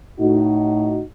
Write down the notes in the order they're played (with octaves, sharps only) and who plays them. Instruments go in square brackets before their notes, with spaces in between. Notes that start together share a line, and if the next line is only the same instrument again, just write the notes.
[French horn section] A2 D#4 F#4